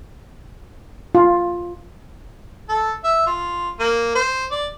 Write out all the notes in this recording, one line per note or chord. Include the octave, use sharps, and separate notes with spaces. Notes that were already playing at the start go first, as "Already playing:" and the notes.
F4
A4
E5
F4
A#3
C5
D5